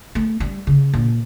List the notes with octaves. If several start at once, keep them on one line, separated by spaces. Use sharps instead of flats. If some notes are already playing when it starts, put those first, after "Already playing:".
A3
G3
C#3
A#2